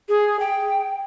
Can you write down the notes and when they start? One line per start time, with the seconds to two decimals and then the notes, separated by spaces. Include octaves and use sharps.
0.09 G#4
0.40 G5